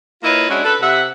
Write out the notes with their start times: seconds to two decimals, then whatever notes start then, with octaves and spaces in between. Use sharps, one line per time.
0.23 A#3 E4 F4 B4 C#5 D#5
0.49 G#3 C#4 D4 E4 F#4
0.65 A4 B4
0.81 C3 E5 F#5